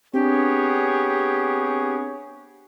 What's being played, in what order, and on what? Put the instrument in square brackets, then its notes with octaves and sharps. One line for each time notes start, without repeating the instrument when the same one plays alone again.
[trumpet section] B3 G#4 C#5 [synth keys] C4 D4 [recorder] G4